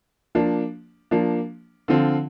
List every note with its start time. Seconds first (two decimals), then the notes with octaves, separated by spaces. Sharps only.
0.35 F3 A#3 D4
1.11 F3 A#3 D4
1.88 D3 F3 C4 F4